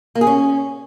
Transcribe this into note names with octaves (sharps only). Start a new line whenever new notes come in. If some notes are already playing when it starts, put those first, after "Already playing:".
A#3
G#4
C#4